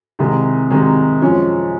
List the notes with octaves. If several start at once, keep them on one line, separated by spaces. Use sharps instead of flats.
C2 C3 D#3 G#3
C2 C3 D#3 G#3
F#2 F3 G#3 C#4